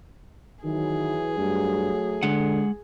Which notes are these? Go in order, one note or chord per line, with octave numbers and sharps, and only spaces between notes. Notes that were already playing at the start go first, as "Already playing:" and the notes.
D#3 E3 F#3 G#4
G2 F#3 A3
D3 G#3 F#5